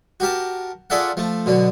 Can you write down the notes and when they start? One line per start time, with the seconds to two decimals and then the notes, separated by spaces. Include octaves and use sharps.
0.20 F#4 G4 A#4 A5
0.90 F4 G#4 A4 D5 E5 F#5
1.17 F3 A3
1.46 B2 D3 F#3